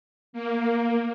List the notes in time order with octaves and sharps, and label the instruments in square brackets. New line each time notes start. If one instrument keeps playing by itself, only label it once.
[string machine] A#3